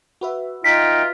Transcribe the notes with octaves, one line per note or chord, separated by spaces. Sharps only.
F#4 B4 E5
D#4 F4 D#5 G5 B6